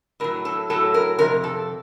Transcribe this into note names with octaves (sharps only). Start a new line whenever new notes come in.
A2 F#3 A#4
A4
A2 F#3 A4
A#4
F2 C3 A#4
A4